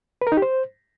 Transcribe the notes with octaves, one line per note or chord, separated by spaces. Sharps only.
B4
A#4
D#4
G4
C5